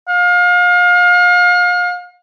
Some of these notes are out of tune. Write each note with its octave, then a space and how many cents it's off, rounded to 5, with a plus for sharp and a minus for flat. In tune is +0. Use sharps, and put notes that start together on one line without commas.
F5 +35